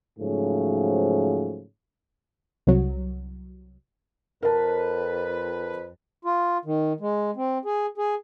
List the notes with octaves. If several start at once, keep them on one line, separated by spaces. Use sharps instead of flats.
G#2 C#3 F3 F#3 A3
C2 F#3
F2 A#4 B4 A5
F4
D#3
G#3
C4
G#4
G#4